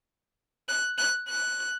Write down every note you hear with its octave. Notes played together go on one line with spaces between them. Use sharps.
F#6
F#6
F#6